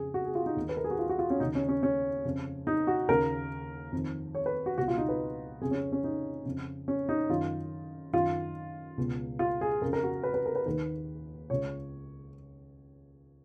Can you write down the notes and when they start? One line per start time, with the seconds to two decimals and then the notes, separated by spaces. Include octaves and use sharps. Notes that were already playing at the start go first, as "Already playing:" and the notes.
Already playing: F2 C#3 G#4
0.14 F#4
0.25 G#4
0.35 F4
0.46 D#4
0.56 D#2 D#3
0.69 B4
0.77 A#4
0.84 G#4
0.91 F#4
0.99 F4
1.09 F#4
1.19 F4
1.30 C#4
1.40 D#2 C#3 D#4
1.55 C#4
1.69 C#4
1.83 C#4
2.25 F2 C#3
2.67 D#4
2.87 F#4
3.08 D#2 C#3 A#4
3.92 F2 D#3
4.35 C#5
4.46 B4
4.66 F#4
4.78 C#2 F#4
4.80 B2
4.88 F4
4.98 D#4
5.09 B4
5.61 F2 C#3 G#4
5.71 C#4
5.92 C#4
6.04 D#4
6.45 F2 C#3
6.88 C#4
7.09 D#4
7.29 F#2 D#3 F4
8.13 F#2 D#3 F4
8.98 C#2 B2
9.39 F4
9.61 G#4
9.81 F2 A#4
9.85 C#3
9.93 A#4
10.03 F#4
10.23 B4
10.34 B4
10.46 A#4
10.55 B4
10.66 D#2 D#3 B4
11.50 C#2 C#3 C#5